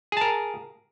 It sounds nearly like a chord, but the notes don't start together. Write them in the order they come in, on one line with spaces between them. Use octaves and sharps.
G#4 A5 A#4